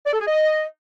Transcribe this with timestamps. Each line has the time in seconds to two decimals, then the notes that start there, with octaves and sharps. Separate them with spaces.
0.06 D5
0.13 A4
0.20 G#4
0.28 D#5